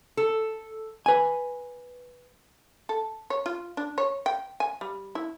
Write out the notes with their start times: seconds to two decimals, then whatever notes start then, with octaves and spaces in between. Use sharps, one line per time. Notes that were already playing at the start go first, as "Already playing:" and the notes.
0.17 A4
1.06 B4 G#5
2.89 A4
3.30 C#5
3.46 F4
3.77 D4
3.98 C#5
4.26 G5
4.60 G#5
4.81 G3
5.15 E4